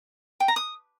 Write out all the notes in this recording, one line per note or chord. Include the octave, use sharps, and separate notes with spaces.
G5
A#5
D#6